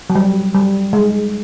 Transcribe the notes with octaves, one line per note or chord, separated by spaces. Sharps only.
F#3
G3
G3
G#3